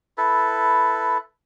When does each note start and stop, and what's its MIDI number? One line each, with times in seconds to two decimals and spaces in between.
0.18 1.18 64
0.18 1.18 69
0.18 1.18 71